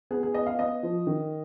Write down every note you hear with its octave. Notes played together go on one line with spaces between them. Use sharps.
B3 G#4
G#4
B3 D#5
F5
B3 D#5
F3
D#3